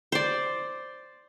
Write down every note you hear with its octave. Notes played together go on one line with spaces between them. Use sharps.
C5 D5